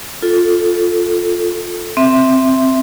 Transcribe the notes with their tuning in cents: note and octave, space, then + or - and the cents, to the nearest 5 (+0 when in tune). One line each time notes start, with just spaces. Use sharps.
F4 +10 A4 +0
C4 +0 E5 +0